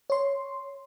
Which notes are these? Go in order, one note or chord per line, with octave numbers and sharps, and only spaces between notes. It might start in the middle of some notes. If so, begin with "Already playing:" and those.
C#5 C6